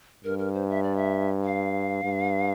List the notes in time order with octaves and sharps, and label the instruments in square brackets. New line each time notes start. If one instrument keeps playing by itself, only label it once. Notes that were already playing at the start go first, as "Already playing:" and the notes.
[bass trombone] G2 [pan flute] A#4
[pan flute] A#4
C5
E5
D5
E5
F5
[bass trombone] G2